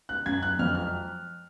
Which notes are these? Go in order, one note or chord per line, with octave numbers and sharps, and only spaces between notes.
F#6
F#2 G#6
F#6
F2 F6
F6